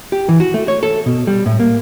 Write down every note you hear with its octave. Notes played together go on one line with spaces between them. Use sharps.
G4
E3
F#4
A3
C#5
A4
B2
G3
A2
A#3